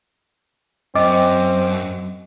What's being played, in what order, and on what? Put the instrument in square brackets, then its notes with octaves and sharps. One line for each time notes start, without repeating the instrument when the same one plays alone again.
[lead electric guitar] F#2 [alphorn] C4 [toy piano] D#5 [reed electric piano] D6